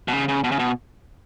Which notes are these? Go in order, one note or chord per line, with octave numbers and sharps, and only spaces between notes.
B2
C#3
C#3
B2
C#3
B2